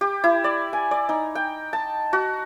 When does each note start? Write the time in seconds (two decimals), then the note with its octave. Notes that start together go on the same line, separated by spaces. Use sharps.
0.01 G4
0.24 E4
0.44 D5
0.73 G#5
0.91 D5
1.09 D#4
1.35 G5
1.73 A5
2.13 F#4